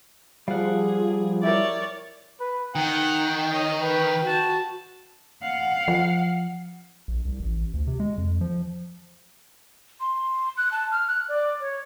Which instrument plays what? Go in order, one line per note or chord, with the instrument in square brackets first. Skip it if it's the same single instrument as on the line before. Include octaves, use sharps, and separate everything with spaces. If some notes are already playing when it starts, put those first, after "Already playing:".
[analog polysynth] F3 [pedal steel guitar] G3 F#5 [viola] G#4 [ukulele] F5
[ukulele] E4 G4 A#4 [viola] C#5 D5
[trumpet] B4
[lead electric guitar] D#3 [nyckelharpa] F#5 [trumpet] G5
[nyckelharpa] C#5 D#5
[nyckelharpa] B4 [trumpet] G5
[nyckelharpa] F#4 A5
[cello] F5 F#5
[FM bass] F3
[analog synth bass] A#1
C2
A1
D2
C3
G#3
F2
F3
[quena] C6
F#6
A5
F6
F#6
D5
C#5